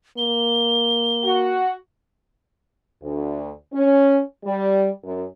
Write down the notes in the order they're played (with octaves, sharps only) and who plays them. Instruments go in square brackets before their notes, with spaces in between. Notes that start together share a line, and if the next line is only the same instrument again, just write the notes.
[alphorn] A#3 [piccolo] G7
[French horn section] F#4
D2
C#4
G3
F#2